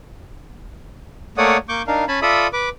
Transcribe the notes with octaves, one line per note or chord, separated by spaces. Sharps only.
A3 A#3 C#5 D5 F#5 D#6
A#3 C#6 D6 G6
D4 D#4 A#4 F5
C#4 G#5 A5 B5
F4 A4 D5 E5 B5 D#6
B4 D6